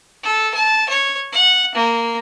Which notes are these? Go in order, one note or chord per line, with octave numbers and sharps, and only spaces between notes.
A4
A5
C#5
F#5
A#3